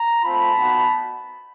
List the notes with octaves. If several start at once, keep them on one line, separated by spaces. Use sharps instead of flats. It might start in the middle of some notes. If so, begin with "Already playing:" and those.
Already playing: A#5
A3 C4 F4 A5 B5
B3 D#4 F#4